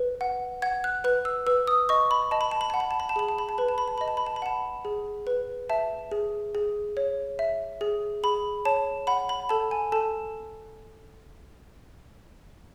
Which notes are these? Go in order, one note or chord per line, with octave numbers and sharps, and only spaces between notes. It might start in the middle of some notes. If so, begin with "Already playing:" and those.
Already playing: B4
F#5
F#5 G#6
F#6
B4 F#6
E6
B4 E6
D#6
D#5 C#6
B5
D#5 A5
B5
A5
B5
F#5 A5
B5
A5
B5
A5
G#4 B5
A5
B5
A5
B4 B5
A5
B5
A5
D#5 B5
A5
B5
A5
B5
F#5 A5
G#4
B4
E5 A5
G#4
G#4
C#5
E5
G#4
G#4 B5
C#5 A5
F#5 B5
B5
A4 A5
G#5
A4 A5